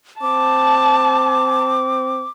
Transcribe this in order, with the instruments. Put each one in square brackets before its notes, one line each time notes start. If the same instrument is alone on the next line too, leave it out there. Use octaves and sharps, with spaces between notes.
[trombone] C4 [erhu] A5 [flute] D6